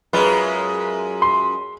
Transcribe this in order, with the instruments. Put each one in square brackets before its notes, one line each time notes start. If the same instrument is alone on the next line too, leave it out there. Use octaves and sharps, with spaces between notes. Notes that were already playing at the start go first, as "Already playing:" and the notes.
[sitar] F#2 G#3 F4 [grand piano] B4
[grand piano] C6